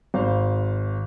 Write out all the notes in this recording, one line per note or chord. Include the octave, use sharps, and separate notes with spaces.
G#1 C5 F5